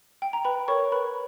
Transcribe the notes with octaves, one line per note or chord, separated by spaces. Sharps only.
G5
A#5
B4 G5 B5
A#4 C#5 C#6
A#4 B4 B5